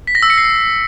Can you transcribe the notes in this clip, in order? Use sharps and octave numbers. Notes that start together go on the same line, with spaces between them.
B6
A#6
E6
C#7
C7